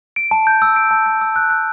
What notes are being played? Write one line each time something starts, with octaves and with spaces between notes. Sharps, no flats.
D7
A5
G6
E6
D7
A5
G6
E6
F#6
F#6